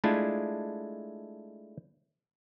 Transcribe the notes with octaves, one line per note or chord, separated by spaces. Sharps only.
G#3 A3 D4 E4 F4